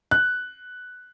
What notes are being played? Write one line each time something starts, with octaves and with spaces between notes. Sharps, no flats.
F#6